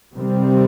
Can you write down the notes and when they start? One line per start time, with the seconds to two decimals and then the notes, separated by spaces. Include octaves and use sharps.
0.14 C3 D#3 G3 C4